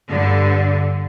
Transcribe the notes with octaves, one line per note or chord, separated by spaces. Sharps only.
G2 D3